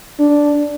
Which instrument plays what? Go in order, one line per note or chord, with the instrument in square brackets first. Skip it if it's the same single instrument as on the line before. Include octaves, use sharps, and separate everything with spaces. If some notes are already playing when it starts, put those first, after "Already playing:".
[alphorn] D4